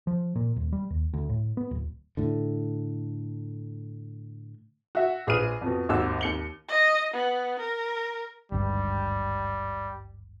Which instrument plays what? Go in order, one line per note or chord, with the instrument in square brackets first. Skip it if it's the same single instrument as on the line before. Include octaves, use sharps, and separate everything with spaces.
[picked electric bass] F3
A#2
D#1
G3
D#2
D2
A2
B3
D1
[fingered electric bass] A2 D3
[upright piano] F#4 E5
A#1 G#4 B4 F6 D#7
F2 B2
G#1 D#2 F#4 E6
D#2 C#7 G7
[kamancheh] D#5
B3
A#4
[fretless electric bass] G#1 D2 G2 [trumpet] G3